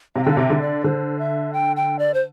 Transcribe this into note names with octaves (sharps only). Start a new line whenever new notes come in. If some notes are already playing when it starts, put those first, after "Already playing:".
C3 F5
G5
D3 F5
C3 E5
D3
D5
D3 C5
E5
G5
G5
D5
C5